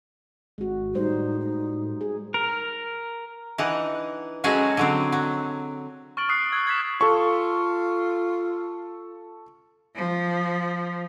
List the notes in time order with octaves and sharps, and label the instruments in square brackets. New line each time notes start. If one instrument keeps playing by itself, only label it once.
[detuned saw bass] G#1 [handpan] G#3 F#4
[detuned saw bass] A2 [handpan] G3 C5 [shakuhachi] D#4
[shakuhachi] D#4
[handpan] G#4
[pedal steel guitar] A#4
[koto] E3 D4 D#4 F#5
F#3 G#3 C#4 F#4 G#4 A4
D3 F#3 C4
F#3
[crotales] C#6 F6 A6 D7 F#7
C#6 D#6 F#6 C7 C#7
E6 F#6 G#6
F#6 G#6 A6 B6 E7
[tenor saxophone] F4 [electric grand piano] A4 C#6
[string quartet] F3